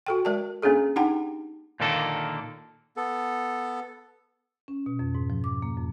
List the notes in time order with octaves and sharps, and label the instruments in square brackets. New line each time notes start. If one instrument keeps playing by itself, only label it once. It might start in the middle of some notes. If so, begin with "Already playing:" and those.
[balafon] F#4 A4 G5
G#3 A#4 D5 A5
A#3 C#4 D4 G#4 A4
D4 D#4 G4 F#5 G5 A5
[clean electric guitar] A#2 D3 D#3 A#3 A4
[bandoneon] B3 A4
[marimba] C#4
B2
F2
G#2
F3
D6
A#3
F2